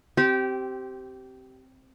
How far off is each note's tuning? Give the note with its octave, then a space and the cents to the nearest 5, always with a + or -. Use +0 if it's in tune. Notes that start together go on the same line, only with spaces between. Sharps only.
C4 +0 G4 -20